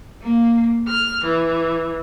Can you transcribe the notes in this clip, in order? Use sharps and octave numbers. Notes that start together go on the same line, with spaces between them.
A#3
F6
E3